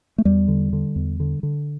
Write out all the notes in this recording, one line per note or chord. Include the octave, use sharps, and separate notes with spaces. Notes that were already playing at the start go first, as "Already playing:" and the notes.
A3
E2 G3
D3
D3
E2
D3
D3